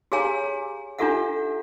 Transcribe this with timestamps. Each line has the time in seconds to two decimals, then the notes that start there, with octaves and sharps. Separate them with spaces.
0.12 G4 G#4 C#5 F5 G#5 A#5
0.99 D4 F4 G4 A4 E5 F#5